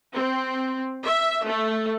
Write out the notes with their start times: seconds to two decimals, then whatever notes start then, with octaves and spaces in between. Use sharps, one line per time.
0.14 C4
1.04 E5
1.44 A3